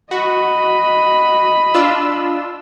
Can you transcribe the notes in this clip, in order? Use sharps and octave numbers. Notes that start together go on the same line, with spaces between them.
F#4 D#5 B5
D4 F4 E6